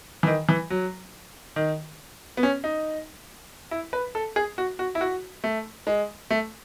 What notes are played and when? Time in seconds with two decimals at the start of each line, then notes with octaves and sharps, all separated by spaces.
0.23 E3
0.27 D#3
0.49 E3
0.70 F#3
1.56 D#3
2.37 B3
2.43 C#4
2.64 D#4
3.71 E4
3.93 B4
4.15 A4
4.36 G#4
4.58 F#4
4.79 F#4
4.95 E4
5.01 F#4
5.44 A3
5.87 G#3
6.31 A3